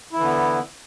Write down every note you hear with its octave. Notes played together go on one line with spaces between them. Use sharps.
D3 E3 B3 E4